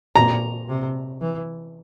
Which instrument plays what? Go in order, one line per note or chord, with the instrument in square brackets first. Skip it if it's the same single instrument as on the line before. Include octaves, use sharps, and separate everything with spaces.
[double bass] A#2 [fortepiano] A#5
[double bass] C3
E3